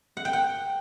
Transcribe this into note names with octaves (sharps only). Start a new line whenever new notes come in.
F#5
G5
F#5